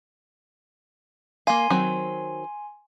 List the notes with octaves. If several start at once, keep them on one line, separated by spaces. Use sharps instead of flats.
A#3 F5 G#5 C6
D#3 F#3 C4